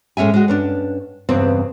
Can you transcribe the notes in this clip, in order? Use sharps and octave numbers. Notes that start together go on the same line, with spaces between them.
A2 G#3 C#4 E5 G#5
G#3 F#4
G2 C#4 D4
E2 G2 C#3 C4